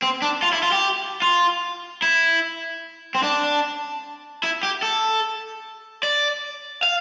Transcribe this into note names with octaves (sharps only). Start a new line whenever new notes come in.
C4
D4
F4
E4
F4
G4
F4
E4
C4
D4
E4
G4
A4
D5
F5